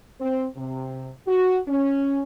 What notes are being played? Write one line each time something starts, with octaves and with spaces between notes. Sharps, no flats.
C4
C3
F#4
C#4